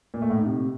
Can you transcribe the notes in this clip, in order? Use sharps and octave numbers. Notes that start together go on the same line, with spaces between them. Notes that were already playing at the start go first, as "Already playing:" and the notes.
A#2
A3
A2
D#4
C3